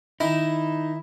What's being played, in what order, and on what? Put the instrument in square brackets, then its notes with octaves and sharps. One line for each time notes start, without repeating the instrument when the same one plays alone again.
[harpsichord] D#3 D#5 [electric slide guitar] D#4 [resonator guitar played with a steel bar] E4